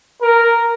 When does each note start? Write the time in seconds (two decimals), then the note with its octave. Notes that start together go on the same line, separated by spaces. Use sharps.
0.22 A#4